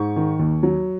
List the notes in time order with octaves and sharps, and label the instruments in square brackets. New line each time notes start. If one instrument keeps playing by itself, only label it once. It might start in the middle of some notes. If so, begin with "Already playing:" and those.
Already playing: [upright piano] G#2 C#6
D#3
D#2
F#3